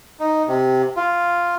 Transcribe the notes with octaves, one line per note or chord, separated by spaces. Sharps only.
D#4
C3
F4